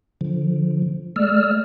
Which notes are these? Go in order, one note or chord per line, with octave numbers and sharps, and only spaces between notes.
D3 F3
G#3 A3 D5 E6 F6